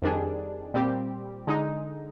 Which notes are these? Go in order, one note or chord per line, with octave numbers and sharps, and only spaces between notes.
F2 D#3 G3 D4 G#4
A#2 G3 C4 G4
D3 G#3 D#4